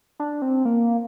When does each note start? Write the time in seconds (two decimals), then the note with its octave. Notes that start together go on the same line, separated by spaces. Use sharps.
0.20 D4
0.42 C4
0.65 A#3